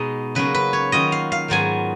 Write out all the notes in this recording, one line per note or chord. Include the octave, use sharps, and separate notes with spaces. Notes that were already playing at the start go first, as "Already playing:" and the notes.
Already playing: B2 G#3 D#4 D#5
C#3 F#3 A#3 C#4 B4
B4
C#5
D#3 F#3 C#4 F4 D#5
F5
F5
G#2 D#3 F#3 B3 F4 G#5